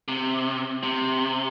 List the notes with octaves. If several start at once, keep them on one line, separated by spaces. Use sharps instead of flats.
C3
C3